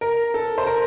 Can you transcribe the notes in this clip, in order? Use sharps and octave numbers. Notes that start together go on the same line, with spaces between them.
A#4
A4
C5
A#4